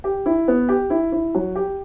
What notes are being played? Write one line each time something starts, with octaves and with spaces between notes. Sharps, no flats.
G4
E4
B3
G4
E4
E4
F#3
G4